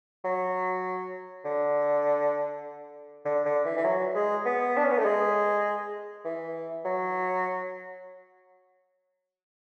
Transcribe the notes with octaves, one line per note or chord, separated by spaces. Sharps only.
F#3
D3
D3
D3
E3
E3
F#3
G#3
B3
D4
C#4
B3
A3
G#3
E3
F#3